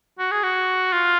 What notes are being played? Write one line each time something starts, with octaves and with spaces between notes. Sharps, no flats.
F#4
G#4
F#4
F4